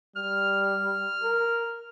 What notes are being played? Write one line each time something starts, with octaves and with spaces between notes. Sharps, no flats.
G3 F6
A#4